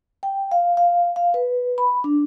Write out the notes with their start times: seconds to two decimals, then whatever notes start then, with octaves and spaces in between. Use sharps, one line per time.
0.23 G5
0.52 F5
0.77 F5
1.16 F5
1.34 B4
1.78 B5
2.04 D4